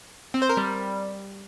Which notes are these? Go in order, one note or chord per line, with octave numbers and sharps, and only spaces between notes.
C4
C5
A#4
G3